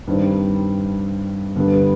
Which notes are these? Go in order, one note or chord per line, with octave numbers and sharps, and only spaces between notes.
G2 D#3 G3 C4
G2 D3 G3 B3